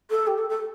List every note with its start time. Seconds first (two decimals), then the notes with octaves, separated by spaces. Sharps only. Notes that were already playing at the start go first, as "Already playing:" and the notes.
0.10 A4
0.27 G4
0.38 A4
0.49 A4